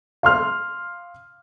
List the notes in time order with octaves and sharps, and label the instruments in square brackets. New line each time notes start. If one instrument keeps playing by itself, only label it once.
[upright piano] F5 C6 F6